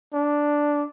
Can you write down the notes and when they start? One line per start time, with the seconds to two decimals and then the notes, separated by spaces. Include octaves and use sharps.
0.14 D4